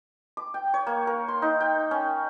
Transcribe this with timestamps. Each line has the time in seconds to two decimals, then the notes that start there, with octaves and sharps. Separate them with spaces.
0.37 D6
0.54 G5
0.74 C#5
0.87 A#3
1.07 A#4
1.28 C6
1.42 D#4
1.60 G5
1.91 C#4